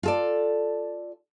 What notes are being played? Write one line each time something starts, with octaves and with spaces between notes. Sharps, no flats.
F4 A4 D5